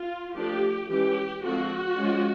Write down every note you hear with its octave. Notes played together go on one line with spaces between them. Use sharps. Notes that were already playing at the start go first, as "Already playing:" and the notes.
Already playing: F4
F3 A3 D4 G4
E3 G#3 C#4 G4
D3 F3 G#3 C4 F#4
F3 G#3 C#4